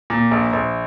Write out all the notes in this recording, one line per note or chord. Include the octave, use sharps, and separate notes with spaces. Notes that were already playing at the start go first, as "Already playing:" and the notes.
A#2
A#1
A#1